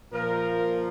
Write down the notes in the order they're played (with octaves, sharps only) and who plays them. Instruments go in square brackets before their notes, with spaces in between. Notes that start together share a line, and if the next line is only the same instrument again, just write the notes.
[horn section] A#2 F3 A#4